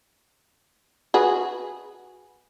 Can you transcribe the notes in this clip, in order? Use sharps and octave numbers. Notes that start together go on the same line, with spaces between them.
F#4 G#4 B4